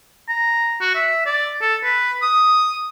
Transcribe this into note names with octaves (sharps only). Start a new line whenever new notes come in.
A#5
F#4
E5
D5
A4
B4
D#6